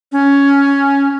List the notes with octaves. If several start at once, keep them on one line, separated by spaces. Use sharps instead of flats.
C#4